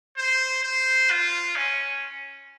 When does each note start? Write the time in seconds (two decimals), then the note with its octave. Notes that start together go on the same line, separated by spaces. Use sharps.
0.17 C5
0.63 C5
1.10 F4
1.56 C#4